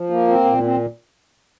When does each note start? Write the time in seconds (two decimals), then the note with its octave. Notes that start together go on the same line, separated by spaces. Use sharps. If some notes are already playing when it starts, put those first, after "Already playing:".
Already playing: F3
0.10 A#3
0.28 C4
0.45 A#2
0.63 C4